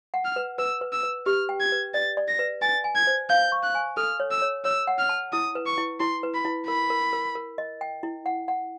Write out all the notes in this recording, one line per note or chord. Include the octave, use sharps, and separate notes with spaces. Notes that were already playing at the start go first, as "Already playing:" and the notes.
F#5
F6
B4
B4 E6
B4
E6
B4
G4 F6
G5
G#6
B4
D5 A6
D5
A#6
B4
G#5 A6
G#5
G#6
C5
F5 G6
C#6
F#6
G#5
A4 F6
C#5
E6
C#5
C#5 E6
F#5
F6
A5
E4 D#6
B4
C#6
E4
E4 C6
B4
B5
E4
A#4 B5
A#4
A#4
A#4
D#5
G5
E4
F#5
F#5